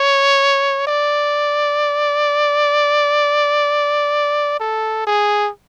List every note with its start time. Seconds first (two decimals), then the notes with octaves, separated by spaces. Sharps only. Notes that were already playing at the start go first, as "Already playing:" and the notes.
Already playing: C#5
0.87 D5
4.60 A4
5.06 G#4